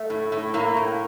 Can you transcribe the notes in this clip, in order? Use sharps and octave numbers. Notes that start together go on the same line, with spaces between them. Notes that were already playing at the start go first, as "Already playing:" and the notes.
Already playing: A3
A2
A2
A2 A#3
A2